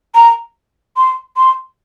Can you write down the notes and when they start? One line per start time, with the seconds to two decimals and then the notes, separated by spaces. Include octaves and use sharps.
0.15 A#5
0.97 C6
1.37 C6